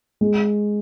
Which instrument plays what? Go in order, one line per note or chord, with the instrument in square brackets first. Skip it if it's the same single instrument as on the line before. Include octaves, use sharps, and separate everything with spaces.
[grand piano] G#3